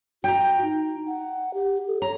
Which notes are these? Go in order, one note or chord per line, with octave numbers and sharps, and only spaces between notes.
F#4 G5 A#5
D#4
F#5
G4
A4
C#5 A#5